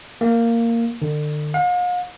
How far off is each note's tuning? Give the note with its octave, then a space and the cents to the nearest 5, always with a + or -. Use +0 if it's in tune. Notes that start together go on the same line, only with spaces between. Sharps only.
A#3 -10
D3 +35
F5 +45